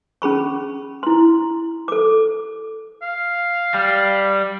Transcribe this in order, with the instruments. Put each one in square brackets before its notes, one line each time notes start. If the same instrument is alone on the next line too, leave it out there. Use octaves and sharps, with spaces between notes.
[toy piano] C#4 G#4 B5 C#6
E4 C6
A4 D6
[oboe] F5
[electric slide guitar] G3